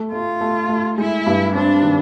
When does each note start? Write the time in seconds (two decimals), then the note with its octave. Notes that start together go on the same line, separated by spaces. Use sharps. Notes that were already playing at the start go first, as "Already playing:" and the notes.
Already playing: A3
0.12 A3 F4
0.41 A3
0.69 A3
0.98 G#3 E4
1.26 G2
1.55 C4 D4
1.83 D#3